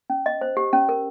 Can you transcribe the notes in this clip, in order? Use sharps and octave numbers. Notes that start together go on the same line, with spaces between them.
C#4
D#5
C5
G4
C#4
A#4